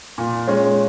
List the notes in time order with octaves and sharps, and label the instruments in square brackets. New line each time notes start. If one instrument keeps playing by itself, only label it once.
[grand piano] A#2
G#3 C#4